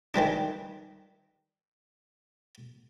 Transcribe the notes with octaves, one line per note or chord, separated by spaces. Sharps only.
D#3 E3 G3 D4